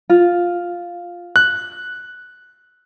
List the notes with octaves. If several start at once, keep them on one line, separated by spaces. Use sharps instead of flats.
F4
F#6